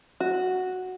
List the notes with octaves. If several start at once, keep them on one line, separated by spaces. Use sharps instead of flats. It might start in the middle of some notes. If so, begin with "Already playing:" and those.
F#4